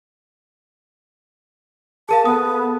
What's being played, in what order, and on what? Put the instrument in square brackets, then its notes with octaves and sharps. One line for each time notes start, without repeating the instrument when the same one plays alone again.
[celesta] G#4 A#4 F5 [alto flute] A5
[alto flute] B3 [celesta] A4 D#6